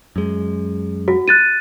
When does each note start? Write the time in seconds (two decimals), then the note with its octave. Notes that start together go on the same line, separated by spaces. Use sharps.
0.16 F#2 G#3
1.08 F#4
1.28 F#6 A6 D#7